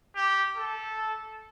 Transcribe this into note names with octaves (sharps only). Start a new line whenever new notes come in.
G4
A4